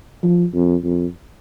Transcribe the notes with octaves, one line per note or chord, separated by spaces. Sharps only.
F3
F2
F2